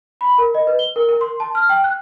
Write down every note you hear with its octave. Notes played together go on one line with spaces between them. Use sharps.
B5
A#4
D#5
B4
G7
A#4
A#4
C6
A5
F6
G5
F#6